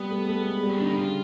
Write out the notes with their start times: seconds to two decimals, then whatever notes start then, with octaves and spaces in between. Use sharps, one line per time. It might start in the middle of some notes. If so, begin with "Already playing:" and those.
Already playing: G3 B3
0.11 A3
0.29 A3
0.45 G#3
0.63 G3
0.70 C#4
0.76 D4
0.80 D3 D#4
0.90 E4
0.97 C#3 F4